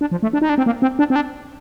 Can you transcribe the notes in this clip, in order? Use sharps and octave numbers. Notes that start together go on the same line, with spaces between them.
D4
F3
A3
D4
D#4
D4
C4
A#3
C4
D4
C4
D4